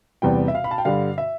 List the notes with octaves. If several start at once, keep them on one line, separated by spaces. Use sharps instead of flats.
E2 C3 G3 B3 G5
E5
F5
B5
A5
G5
G2 D3 G3 F5
E5